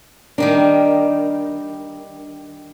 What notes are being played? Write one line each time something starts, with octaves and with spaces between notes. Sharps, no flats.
D#3 G3 A#3 D4